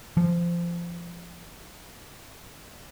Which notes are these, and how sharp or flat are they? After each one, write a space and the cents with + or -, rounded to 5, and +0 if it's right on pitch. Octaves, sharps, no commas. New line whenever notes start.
F3 -20